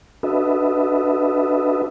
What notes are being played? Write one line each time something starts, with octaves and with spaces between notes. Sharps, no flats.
D4 F#4 A4 B4 D#5 E5